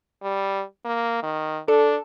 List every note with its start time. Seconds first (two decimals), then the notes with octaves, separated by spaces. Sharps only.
0.22 G3
0.85 A#3
1.23 D#3
1.68 D4 A4